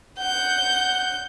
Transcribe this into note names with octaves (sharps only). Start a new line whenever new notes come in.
F#5 G6